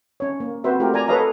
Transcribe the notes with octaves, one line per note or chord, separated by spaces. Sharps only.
C#4 C#5
A#3
C4 F#4 B4 C5 E5
A3 F4 G4 A#4
D5 G#5 A#5
A4 B4 C#5 D#5 F5 A#5